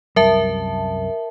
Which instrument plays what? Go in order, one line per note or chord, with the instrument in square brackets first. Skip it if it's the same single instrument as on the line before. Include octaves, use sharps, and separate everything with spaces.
[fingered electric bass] C2 F#2 G3 [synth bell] A#4 E5 A5